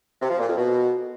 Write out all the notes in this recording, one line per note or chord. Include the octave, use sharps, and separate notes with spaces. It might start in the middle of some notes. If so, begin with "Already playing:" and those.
C3
F3
A#2
F2
B2